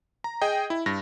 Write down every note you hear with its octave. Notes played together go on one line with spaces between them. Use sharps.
A#5
G#4 D#5 G5
E4
G2 A#6